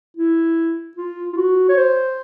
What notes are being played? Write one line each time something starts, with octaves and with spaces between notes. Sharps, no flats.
E4
F4
F4
F#4
C#5
C5